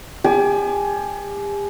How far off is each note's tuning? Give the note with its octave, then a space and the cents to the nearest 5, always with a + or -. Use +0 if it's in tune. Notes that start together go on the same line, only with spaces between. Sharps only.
G4 +45 G#5 +35 D6 +0